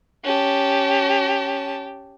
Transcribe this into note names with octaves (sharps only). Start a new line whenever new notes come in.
C#4 G4 A5